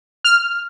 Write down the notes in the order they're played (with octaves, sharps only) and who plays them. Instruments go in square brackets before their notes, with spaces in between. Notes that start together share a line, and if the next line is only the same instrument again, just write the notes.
[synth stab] F6